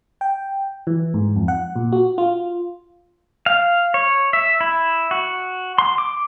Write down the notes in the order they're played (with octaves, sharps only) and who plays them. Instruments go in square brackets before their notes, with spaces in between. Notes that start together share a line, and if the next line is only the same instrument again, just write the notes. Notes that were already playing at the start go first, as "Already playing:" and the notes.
[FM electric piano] G5
E3
G#2
F2
F#5
A#2
F#4
F4
[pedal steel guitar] F5
C#5
E5
E4
F#4
C6
D6